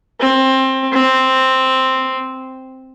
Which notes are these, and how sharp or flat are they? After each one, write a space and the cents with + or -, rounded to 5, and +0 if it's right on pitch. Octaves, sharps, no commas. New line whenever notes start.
C4 +20
C4 +0